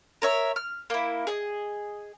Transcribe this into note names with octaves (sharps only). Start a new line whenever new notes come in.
A#4 C#5 E5
F6
A#3 E4
G#4 D#5